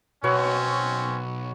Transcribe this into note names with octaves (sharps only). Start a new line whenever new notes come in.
B1 F#3 C4 C#4 B4 C#5